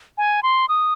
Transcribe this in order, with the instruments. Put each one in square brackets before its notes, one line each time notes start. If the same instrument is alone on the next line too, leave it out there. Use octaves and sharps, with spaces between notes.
[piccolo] G#5
C6
D#6